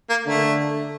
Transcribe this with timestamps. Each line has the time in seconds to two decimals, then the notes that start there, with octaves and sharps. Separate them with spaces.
0.10 A#3
0.26 D3 A3